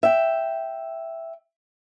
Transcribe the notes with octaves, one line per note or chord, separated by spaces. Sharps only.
E5 G5